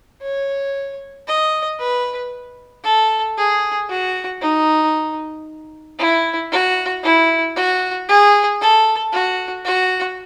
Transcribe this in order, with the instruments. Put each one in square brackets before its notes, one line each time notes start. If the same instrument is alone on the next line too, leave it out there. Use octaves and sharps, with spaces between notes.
[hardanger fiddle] C#5
D#5
B4
A4
G#4
F#4
D#4
E4
F#4
E4
F#4
G#4
A4
F#4
F#4